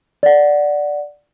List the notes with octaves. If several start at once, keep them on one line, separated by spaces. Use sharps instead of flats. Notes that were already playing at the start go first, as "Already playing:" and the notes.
D5 F#5